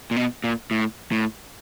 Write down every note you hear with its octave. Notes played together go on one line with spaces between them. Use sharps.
A#2
B2
A#2
A2
A2